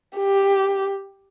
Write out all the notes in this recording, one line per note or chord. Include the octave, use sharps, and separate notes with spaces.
G4